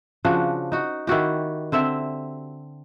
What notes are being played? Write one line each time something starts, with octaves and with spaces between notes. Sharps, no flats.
C#3 F3 D4 F#4
D#4 F#4
D#3 E4 F#4 G4
D3 C4 E5